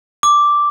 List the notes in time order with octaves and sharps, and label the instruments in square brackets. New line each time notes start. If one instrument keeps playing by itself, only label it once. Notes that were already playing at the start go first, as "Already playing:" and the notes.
[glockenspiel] D6